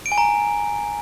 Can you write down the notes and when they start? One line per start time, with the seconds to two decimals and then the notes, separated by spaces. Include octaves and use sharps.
0.06 D7
0.12 G#5
0.18 A#5